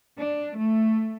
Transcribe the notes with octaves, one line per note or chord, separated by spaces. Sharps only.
D4
A3